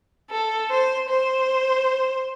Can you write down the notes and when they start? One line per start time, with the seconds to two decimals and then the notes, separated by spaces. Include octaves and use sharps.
0.30 A4
0.70 C5
1.08 C5